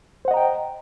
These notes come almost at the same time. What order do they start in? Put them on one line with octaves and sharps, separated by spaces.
C5 F#5 D#5 A#5 G5